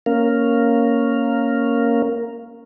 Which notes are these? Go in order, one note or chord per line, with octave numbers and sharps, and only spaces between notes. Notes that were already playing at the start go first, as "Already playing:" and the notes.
A#3 C#4 A#4 F5